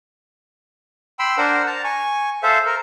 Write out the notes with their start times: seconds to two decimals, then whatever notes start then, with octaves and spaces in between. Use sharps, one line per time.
1.19 G5 B5 C6 E6
1.38 D4 A#4 C5 F#5
1.67 A5 A#5
1.84 G#5 C#6
2.43 A4 C5 E5 F5
2.66 A#4